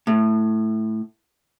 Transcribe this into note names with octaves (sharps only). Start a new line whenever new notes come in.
A2